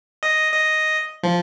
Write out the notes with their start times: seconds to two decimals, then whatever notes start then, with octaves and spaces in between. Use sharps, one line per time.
0.23 D#5
0.54 D#5
1.23 F3